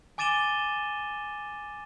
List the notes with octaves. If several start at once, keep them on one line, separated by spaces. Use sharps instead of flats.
G#5 D6 A6 D#7 E7 G7